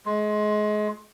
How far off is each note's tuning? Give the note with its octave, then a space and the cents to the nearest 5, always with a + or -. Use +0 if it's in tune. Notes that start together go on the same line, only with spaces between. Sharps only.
G#3 +25